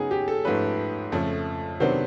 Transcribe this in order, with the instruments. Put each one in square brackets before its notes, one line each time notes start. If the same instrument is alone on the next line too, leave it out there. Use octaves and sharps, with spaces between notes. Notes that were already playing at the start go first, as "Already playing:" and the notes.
Already playing: [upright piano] C#3 F#3 B3 D#4 [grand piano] G#4
[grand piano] G4
A4
[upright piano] G#2 F3 A3 C#4 [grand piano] B4
[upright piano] F2 C#3 F3 A3
[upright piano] C3 D#3 F#3 B3 D4 [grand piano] C5